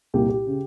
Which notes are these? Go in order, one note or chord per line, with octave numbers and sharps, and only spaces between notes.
C2 A#2 G4
G4
C#3